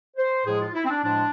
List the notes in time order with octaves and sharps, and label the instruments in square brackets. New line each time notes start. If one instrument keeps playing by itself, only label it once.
[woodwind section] C5
A2 F3 G#3 G#4
F4
E4
C4
D4
A2 F3 G#3 D4